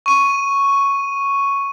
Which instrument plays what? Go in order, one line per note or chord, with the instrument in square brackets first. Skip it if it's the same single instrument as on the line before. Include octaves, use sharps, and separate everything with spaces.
[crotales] C#6 D#7